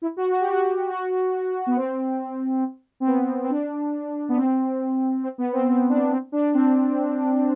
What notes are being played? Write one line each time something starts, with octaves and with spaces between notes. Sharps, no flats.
E4
F#4
F#4
G4
F#4
F#4
B3
C4
C4
B3
C4
C4
D4
B3
C4
C4
B3
C4
C4
D4
C4
D4
C4